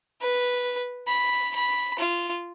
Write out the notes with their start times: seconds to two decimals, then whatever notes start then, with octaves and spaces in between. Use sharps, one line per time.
0.22 B4
1.07 B5
1.55 B5
1.99 F4